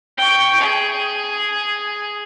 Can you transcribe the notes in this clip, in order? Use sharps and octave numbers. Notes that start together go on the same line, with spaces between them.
G5 C#6
G#4